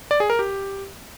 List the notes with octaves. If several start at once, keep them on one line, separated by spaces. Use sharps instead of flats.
D5
G#4
A#4
G4